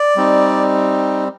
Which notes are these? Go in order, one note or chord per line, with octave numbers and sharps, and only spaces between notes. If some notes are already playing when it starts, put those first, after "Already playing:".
Already playing: D5
G3 C4 D#4